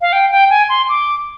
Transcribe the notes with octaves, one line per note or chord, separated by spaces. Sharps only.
F5
G5
G5
G#5
C6
D6